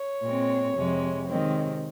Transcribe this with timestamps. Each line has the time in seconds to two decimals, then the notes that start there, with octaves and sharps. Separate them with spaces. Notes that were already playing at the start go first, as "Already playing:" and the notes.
Already playing: C#5
0.22 A#2 G#3 C4
0.75 F2 C3 F3 G#3
1.28 C3 D#3 G#3 C4